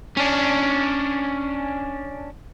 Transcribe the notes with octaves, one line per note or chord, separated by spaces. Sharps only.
C#4 D4